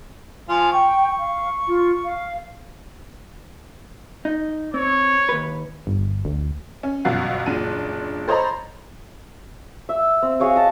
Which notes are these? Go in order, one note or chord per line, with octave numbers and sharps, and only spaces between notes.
F3 F4 G#5
G5 C#6
F5
F4
F5
D#4
C4 C#5
D#2 B4
G1
D2
C#4
G1 F#2 B2 F4 F#5 C7
F#1 A#2 D4 D#7
A4 C5 C#5 D#5 A#5 B5
E5
C4
F#4 G#4 C#5 F5
D#5 A5